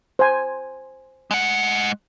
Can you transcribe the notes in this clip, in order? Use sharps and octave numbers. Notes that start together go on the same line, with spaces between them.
C5 G#5
G#3 F#5